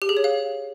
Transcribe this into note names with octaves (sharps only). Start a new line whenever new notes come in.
G4
G#4
C#5
F5